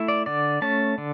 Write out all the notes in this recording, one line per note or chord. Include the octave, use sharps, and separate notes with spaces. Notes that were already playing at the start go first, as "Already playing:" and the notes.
Already playing: A3 E4
D5
D3 D5
A3 C#4 A5
D3